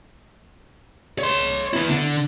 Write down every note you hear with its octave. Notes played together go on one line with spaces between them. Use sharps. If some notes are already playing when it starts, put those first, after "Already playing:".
C#5 C6
B3 E4
D3